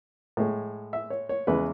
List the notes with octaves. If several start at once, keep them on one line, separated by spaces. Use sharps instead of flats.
A2 G#3
E5
C#5
C#5
E2 C#3 G#3 B4